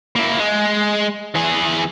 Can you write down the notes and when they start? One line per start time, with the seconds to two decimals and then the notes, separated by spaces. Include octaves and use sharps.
0.15 A#3 E4
0.39 G#3
1.35 E3 G#4